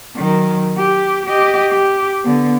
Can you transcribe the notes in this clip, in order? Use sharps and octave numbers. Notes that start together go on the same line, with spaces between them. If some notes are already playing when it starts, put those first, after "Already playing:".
D#3 F#3
G4
G4 D#5
G4
D3 B3